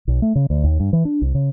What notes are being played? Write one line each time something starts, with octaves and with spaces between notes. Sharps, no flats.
B1
A3
C#3
D2
D#2
G2
E3
D4
C2
C#3